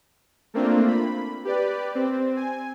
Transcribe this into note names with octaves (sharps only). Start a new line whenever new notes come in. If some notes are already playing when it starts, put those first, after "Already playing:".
A3 A#3 C4 D4 F4
B5
G4 B4 D5
C4
G#5